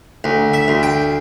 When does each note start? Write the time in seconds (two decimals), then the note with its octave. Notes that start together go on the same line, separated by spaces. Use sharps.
0.24 D2
0.53 E5
0.68 D2
0.83 G5